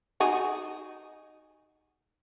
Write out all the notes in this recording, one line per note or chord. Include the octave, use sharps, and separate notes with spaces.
D#4 F#4 G#4